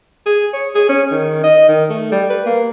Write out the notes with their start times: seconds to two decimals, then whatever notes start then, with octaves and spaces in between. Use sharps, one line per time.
0.26 G#4
0.53 C#5
0.75 G#4
0.89 C#4
1.11 D#3
1.43 D#5
1.68 D#3
1.89 A3
2.12 G3
2.30 B4
2.46 A#3